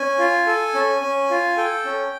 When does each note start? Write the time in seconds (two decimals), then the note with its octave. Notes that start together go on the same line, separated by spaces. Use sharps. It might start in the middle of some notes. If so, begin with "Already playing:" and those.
Already playing: C#4 G#5
0.19 F4
0.46 A4
0.74 C#4
1.02 C#4
1.30 F4
1.57 A4 G5
1.85 C#4